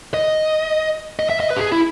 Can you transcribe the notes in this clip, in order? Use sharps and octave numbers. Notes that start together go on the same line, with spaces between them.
D#5
D#5
E5
D#5
B4
G4
G#4
E4